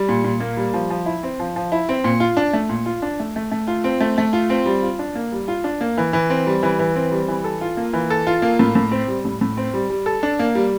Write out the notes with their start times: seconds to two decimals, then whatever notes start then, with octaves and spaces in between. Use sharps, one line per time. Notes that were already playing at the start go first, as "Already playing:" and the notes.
Already playing: G3
0.09 A#2
0.24 A#2
0.40 A#3
0.57 G3
0.74 F3
0.90 F3
1.06 E4
1.23 C4
1.40 F3
1.56 F3
1.72 E4
1.89 C4
2.04 A#2
2.20 F4
2.37 D4
2.53 A3
2.69 A#2
2.86 F4
3.02 D4
3.20 A3
3.36 A3
3.52 A3
3.68 F4
3.84 C4
4.01 A3
4.18 A3
4.33 F4
4.50 C4
4.66 G3
4.83 F4
4.99 D4
5.15 A#3
5.32 G3
5.48 F4
5.64 D4
5.81 A#3
5.97 E3
6.13 E3
6.30 C4
6.47 G3
6.63 E3
6.79 E3
6.96 C4
7.11 G3
7.28 E3
7.44 A4
7.61 F4
7.77 A#3
7.93 E3
8.10 A4
8.27 F4
8.42 A#3
8.59 A2
8.75 A2
8.91 C4
9.08 G3
9.25 A2
9.41 A2
9.57 C4
9.74 G3
9.90 G3
10.06 A4
10.23 D4
10.39 A#3
10.55 G3